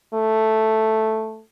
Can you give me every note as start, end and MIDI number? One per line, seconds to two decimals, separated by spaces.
0.14 1.41 57